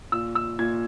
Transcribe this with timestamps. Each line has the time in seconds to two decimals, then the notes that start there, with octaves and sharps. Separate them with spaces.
0.12 A#2 E6
0.35 E6
0.59 A#2 G#6